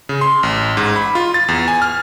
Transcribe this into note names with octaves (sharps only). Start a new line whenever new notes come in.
C#3
C6
A1
G#2
B5
F4
A6
E2
G#5
F6